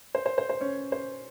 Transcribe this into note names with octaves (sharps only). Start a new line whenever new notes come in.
C5
C5
C5
C5
C#4 C#5
C5